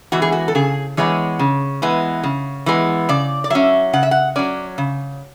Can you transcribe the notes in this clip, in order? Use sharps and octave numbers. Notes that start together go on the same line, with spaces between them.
E3 G#3 B3 F#4
G#4
F#4
A4
C#3 G#4
E3 G#3 B3 C#5
C#3
E3 G#3 B3
C#3
E3 G#3 B3
C#3 D5
D5
F#3 C#4 E5
C#3 F#5
E5
F#5
F#3 C#4 D5
C#3